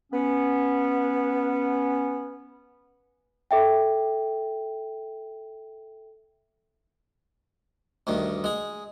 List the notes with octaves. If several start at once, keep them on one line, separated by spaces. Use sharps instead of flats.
B3 C#4
A4 E5 G5
D2 G2 D#3
G#3 G#4